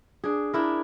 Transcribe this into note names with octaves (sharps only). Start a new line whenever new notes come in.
D4 G#4
D4 E4 A#4